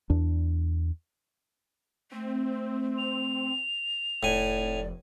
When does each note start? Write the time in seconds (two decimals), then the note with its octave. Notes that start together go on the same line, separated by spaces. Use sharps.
0.10 E2 D4
2.12 A3 C4
2.98 F7
4.23 F1 A2 D5 G#5